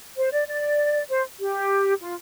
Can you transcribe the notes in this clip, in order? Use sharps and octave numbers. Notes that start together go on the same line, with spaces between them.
C5
D5
D5
C5
G4
F4